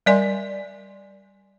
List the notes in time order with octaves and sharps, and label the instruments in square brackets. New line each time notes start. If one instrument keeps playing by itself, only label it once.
[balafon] G3 A#4 D5 D#5 G#5 C6